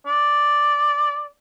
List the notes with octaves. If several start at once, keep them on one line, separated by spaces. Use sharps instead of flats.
D5